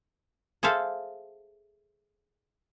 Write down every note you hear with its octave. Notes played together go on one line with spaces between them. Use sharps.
G#4 A4 C5 E5 F5